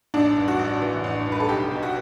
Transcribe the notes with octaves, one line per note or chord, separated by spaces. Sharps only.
A1 D4
G2
F#4
A1
E3
A1
G2
B4
A4
B1 G4
B2
F#4